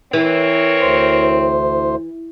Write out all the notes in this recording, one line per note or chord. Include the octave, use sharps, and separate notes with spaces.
E3 C4 A#4 C#5
D2 C5